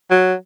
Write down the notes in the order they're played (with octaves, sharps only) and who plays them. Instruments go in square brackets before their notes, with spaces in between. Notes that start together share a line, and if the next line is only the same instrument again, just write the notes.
[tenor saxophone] F#3